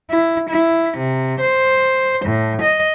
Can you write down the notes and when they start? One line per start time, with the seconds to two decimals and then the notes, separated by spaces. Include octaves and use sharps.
0.10 E4
0.49 E4
0.98 C3
1.40 C5
2.25 A2
2.62 D#5